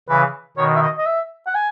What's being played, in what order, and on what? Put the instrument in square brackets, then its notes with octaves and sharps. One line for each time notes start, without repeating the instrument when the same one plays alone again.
[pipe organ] C#3 E3 [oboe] B4
[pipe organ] B2 D#3 [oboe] C#5
[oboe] E5
D#5
D#5
E5
F#5
G#5